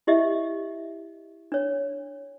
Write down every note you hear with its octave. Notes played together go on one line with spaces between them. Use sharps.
E4 G4 D#5 E5
D4 C#5